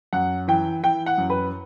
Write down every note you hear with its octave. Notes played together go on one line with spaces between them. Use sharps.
F#2 F#5
E3 G5
E3 G5
F#5
F#2
B4